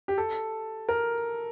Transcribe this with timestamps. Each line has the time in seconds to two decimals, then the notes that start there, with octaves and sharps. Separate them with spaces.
0.08 G4
0.18 A4
0.89 A#4